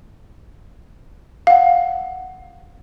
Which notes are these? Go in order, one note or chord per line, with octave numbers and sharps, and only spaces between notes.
F5 F#5